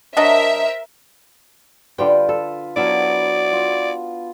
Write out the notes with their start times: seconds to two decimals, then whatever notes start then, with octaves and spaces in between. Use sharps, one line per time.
0.17 F#3 D4 A#4 C5 D#5 E5
1.98 D3 G3 F4 B4 G5
2.29 A4
2.76 F#3 B3 D4 E4 D5 E5 F5
3.53 F4